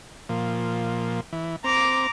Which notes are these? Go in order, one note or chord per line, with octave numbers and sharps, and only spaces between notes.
A#2 F3
E3
C4 A#5 D6